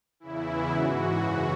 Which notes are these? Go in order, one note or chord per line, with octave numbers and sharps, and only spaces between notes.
E2 C#3 E3 E4
G#2 E3 F#4
F#2 C#3 E3